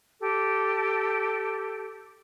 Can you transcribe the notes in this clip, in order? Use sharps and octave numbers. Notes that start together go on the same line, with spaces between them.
G4 A4